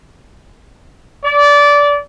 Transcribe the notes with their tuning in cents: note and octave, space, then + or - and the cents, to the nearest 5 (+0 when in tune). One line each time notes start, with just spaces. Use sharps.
D5 -20